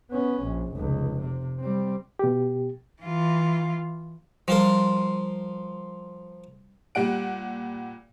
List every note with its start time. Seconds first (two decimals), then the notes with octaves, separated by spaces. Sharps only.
0.11 B3 C#4
0.43 A#1
0.74 F1 C#2
1.20 C3
1.59 G3 C4
2.19 B2 G4
3.02 E3 F4
4.48 F3 G3 F4 A#4
6.95 A#2 G3 F#5 D7